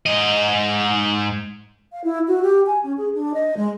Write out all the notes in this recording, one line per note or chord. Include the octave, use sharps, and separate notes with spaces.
G#2 D#5
F5
E4
F#4
G4
G#5
C#4
G#4
D4
D#5
G#3